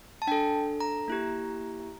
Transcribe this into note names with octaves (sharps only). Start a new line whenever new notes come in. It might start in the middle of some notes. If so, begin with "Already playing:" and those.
A5
D4 A4 G5
A#5
A#3 E4 G4